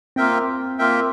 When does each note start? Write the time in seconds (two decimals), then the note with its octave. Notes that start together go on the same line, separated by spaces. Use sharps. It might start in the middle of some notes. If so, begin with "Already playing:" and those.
0.16 A#3 C4 F4 A#4 E5 G5
0.79 A#3 F4 A#4 E5 G5